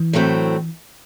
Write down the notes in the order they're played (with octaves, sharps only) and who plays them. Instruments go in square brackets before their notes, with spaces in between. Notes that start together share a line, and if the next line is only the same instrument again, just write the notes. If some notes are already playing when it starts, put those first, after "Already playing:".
Already playing: [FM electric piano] E3
[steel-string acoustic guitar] A2 F#3 A3 C4